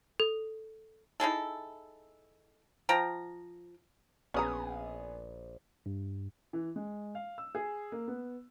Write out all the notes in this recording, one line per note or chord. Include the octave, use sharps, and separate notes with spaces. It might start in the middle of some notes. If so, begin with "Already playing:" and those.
A4
D#4 E4 G#4 A4
F3 G5 A#5
A#1 B3 C#4 G#4 D5 A#5 D#6
G2
E3
G#3
F5
E6
G#4
A#3
B3